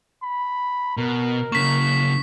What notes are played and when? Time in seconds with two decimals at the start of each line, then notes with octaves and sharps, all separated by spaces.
0.23 B5
0.97 B2 A#4
1.52 C#3 A#3 C#6 B6